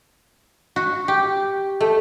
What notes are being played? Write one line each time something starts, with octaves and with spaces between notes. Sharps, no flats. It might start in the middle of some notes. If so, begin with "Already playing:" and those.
F#4
G4
A3